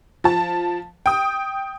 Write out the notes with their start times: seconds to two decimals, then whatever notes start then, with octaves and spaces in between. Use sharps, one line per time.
0.24 F3 A5
1.06 G5 D#6